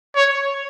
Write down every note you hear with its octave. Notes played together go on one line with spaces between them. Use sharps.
C#5